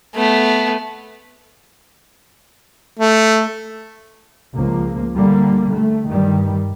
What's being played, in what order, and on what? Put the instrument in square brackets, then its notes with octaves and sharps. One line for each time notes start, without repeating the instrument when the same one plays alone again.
[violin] A3 B3
[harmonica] A3
[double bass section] C#2 F3 A#3
D3 G3 A#3
A3
G2 D#3 G3